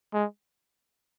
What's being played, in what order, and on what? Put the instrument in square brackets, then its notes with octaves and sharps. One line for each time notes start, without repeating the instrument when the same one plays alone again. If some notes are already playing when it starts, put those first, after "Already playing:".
[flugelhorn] G#3